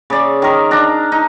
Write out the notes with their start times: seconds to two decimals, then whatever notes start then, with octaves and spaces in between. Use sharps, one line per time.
0.10 C#3 D5
0.42 D#3 A#4
0.71 D4 A#5
1.12 D#4